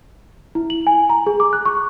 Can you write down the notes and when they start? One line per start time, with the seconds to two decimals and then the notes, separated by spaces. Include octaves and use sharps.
0.55 E4
0.70 F#7
0.87 G#5
1.10 A#5
1.27 G#4
1.40 D6
1.53 F#6
1.66 C#6